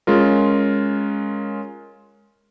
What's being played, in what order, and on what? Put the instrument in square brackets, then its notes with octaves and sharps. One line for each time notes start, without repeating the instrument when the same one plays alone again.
[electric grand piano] G#3 C#4 F4 A#4